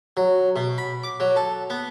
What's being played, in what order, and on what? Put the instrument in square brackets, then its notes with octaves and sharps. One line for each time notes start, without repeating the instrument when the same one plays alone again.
[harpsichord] F#3
B2
B5
D6
F#3
A4
B3